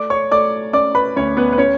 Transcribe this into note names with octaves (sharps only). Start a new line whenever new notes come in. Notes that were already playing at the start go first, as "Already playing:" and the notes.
Already playing: A3 D5 D6
C#5 C#6
A3 D5 D6
C#4 D5 D6
B4 B5
D2 C#4 C#5
B3 B4
B4
C#4 C#5